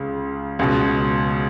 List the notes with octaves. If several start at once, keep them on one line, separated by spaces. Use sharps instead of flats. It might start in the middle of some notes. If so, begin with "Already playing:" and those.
Already playing: C#2 C#3
C#2 B2